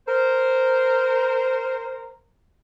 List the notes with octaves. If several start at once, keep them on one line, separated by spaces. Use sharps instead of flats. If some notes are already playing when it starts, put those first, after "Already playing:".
A#4 C5